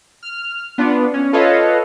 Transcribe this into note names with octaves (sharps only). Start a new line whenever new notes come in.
F6
B3 D4 F4
C#4
F4 A4 B4 C#5 D#5 F5